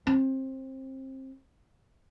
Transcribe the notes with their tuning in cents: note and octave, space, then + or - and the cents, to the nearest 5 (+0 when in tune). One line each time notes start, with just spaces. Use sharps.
C4 +25